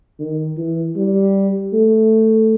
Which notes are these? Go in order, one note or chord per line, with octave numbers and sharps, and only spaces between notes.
D#3
E3
G3
A3